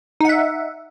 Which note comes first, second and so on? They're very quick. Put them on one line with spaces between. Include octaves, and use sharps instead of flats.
D#4 F#5 E5